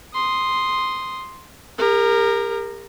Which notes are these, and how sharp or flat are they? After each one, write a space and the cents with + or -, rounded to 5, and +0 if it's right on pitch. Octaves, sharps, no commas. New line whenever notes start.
C6 +0 D#6 +0
G4 +45 A#4 -5